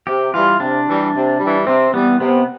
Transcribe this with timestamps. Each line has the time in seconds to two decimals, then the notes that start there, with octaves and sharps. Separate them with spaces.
0.07 C3 G4
0.34 E3 G3 F4
0.60 C3 D4
0.87 E3 G3
1.14 C3
1.40 E3 G3
1.67 C3 C4
1.93 E3 G3 B3
2.20 C3 B3